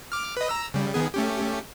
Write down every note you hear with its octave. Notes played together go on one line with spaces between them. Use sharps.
D6 F6
B4 D#5
A#5 E6
C#3 G3
D#3 B3 G#4
A3 C#4 G4